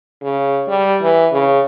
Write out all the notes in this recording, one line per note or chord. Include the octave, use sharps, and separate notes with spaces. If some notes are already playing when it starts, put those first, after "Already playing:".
C#3
G3
E3
C#3